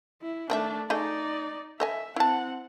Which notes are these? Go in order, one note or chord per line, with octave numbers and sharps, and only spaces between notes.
E4
D#3 A3 D4 G#4 E5
A3 D#4 G#4 D5 D#5
A4 D#5 E5 G#5
C4 E4 F#5 A5